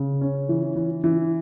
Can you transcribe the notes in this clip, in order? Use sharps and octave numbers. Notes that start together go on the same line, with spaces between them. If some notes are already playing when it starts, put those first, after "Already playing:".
Already playing: C#3
C#4
E3
E3
E3